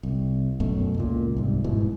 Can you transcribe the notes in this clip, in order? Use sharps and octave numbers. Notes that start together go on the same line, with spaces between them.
C2
B1 F#2 B2 A3
C#2 A#2
C2 G#2
E2 G#2 B2 E3